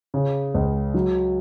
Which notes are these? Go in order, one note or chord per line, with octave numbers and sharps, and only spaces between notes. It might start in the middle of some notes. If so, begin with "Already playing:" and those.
C#3
C#2
F#3